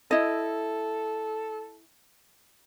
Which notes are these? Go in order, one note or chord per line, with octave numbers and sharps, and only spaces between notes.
E4 A4 D#5